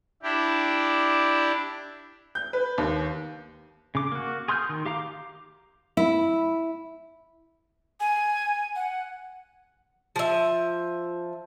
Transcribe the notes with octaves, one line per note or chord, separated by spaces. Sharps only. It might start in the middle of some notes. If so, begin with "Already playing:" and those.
D4 E4 G4
G6
B4
D#2
C#3 D6
A#3 F#4
G#4 C6 D#6 F6 G6
D#3
G4 F5 A#5 D6
E4
G#5
F#5
F3 E5